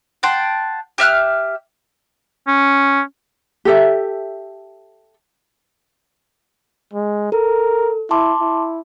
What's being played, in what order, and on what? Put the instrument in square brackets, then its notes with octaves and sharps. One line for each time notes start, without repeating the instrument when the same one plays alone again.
[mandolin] F#5 G5 A5 C6
G4 E5 F6 F#6
[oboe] C#4
[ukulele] G4 A4 E5
[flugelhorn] G#3
[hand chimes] A4 [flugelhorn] A#4
[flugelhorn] E4 [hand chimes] A5 C6 D6
[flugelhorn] E4